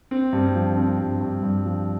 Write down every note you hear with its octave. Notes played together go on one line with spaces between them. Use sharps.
C4
G2 C4
F3
C4
G2
G2
G2
F3